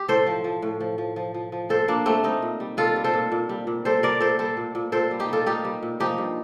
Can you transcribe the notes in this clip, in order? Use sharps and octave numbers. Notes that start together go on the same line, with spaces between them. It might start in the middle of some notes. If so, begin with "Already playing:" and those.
Already playing: G4
A2 A4 C5
F3
F3
A2
F3
F3
F3
F3
F3
A#2 A4 C5
A#2 A#3 D4
G3 A3 C4
G3 C4 D#4
A#2
G3
A#2 F4 A4
G3
A4 C5
A#2
A#2
G3
A#2
G3 A4 C5
G3 A#4 D5
A#2 A4 C5
G3 A4 C5
A#2
A#2
A#2 A4 C5
G3
D#4 G4
G3 F4 A4
A#2 D#4 G4
G3
A#2
F3 D#4 G4
G2